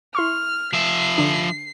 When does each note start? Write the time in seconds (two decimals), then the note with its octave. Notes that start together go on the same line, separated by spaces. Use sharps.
0.15 E4 C6 C#6 F6
0.73 F3 E5 C7
1.18 D3 D4